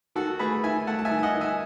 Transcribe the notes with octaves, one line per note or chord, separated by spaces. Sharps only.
D#3 F#4 A4
A3 G#4 B4
D#3 E5 G#5
A3 F#5 A5
A5
E5 G#5
D#3
G#5
D#5 F#5
D#3
E5 G#5